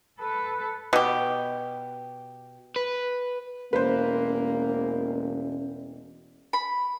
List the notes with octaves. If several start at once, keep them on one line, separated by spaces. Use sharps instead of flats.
A4 B4
B2 G4
B4
E1 A#3 C#4 B4 C5
B5